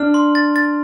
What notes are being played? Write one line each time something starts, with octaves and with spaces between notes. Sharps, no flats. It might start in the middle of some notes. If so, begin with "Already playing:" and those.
Already playing: D4 F6
C6
A6
A6